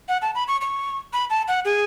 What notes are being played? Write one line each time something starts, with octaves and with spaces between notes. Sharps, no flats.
F#5
A5
B5
C#6
C#6
B5
A5
F#5
G#4